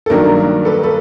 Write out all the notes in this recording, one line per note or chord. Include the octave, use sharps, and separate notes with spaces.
A4
G2 D#3 F#3 A#3 D4 A#4
A4 B4
A4 B4